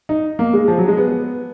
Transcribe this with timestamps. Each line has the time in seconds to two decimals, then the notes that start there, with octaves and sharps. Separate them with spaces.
0.09 D#4
0.39 A#3
0.53 G#3
0.68 F3
0.78 F#3
0.88 G#3
0.97 B3